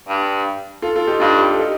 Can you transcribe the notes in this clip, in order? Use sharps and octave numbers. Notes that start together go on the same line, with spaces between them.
G2
F4 A4
F4 A4
D#4 G4
G2 D4 F4
G4
A4
D#4 G4